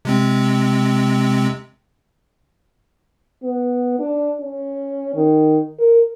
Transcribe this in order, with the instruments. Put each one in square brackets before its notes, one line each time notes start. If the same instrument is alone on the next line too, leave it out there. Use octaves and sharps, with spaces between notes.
[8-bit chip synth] C3 G#3 C4
[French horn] B3
D4
C#4
D#3
A#4